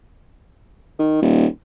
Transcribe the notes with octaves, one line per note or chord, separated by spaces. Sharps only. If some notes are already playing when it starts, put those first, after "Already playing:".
D#3
D#1